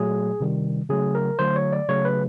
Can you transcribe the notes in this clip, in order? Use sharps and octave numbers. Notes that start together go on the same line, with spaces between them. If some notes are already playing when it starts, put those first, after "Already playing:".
Already playing: A#2 F#3 A3 G#4
C3 D#3 G3
C#3 F#3 A3 G#4
A#4
D3 F#3 A3 C5
C#5
D5
C#3 F#3 A3 C#5
B4